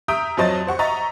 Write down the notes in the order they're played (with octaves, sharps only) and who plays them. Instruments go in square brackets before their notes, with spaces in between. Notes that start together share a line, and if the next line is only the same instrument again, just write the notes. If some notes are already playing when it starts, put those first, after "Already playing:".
[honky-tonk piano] E5 A#5 D#6 G6 D7
F2 F#3 C5 D#5 A5 A6
C5 F#5 C#6
D#5 E5 A#5 C#6 A6